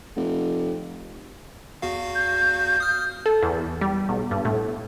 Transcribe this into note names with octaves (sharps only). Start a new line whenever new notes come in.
F1
E2 F#4 F5
G6
D#6 F6
A4
E2
G3
B1
G2
A2